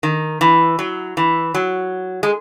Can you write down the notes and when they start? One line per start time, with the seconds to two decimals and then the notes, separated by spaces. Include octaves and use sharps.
0.03 D#3
0.41 E3
0.79 F#3
1.17 E3
1.55 F#3
2.23 G#3